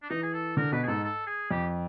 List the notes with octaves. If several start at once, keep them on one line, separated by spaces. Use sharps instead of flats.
D4
E3 D#4
G#4
A4
D3 A#4
B2 B4
G#4
G#2 A4
A4
G#4
F2 G4